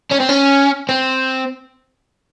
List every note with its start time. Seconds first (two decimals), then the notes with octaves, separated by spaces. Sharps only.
0.11 C#4
0.20 C4
0.29 C#4
0.89 C4